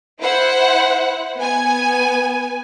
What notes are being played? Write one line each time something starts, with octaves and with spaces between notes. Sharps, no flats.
E4 C5 F#5
B3 G#5